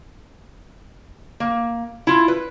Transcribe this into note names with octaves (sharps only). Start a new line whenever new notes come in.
A#3
E4 F4
B4